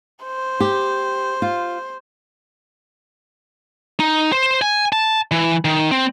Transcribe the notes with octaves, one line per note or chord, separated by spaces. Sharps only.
C5
G4
F4
D#4
C5
G#5
A5
E3
D#3
C4